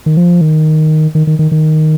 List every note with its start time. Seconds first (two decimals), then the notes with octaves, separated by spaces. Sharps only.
0.06 D#3
0.17 F3
0.41 D#3
1.15 D#3
1.27 D#3
1.39 D#3
1.52 D#3